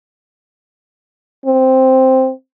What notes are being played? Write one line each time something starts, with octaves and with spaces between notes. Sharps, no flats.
C4